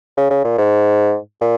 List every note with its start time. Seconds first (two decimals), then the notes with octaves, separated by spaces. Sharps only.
0.17 C#3
0.30 C#3
0.44 A#2
0.58 G#2
1.41 A#2